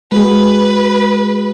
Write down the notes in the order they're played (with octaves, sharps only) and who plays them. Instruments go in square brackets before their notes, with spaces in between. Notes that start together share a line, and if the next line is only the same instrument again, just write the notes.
[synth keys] G#3 F#4 G#4 [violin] B4